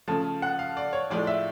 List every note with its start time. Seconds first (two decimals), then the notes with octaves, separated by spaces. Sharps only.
0.08 C#3 F3 A3 A5
0.42 F#5
0.59 F5
0.77 D5
0.93 C#5
1.10 A2 F3 G#3 D5
1.27 E5